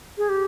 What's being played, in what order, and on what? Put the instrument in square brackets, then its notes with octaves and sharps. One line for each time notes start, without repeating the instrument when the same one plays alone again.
[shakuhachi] G#4
G4